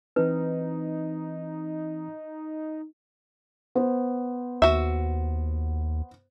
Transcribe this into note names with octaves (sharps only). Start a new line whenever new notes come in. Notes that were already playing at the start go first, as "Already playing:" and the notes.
E3 C4 D#4 B4
B3 C5
D#2 F#4 E5